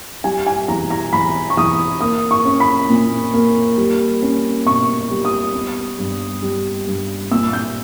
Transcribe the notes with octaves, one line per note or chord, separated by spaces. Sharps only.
G3 G#5
G#5
E2 A#5
A#5
E2 B5
C#6
E2 D#6
A#3 D#6
C#6
C#4
B5
A#2
A#3
G3
C#4
B2 C#6
G3
D#6
B3
G2
G3
G2
A#2 E6
G6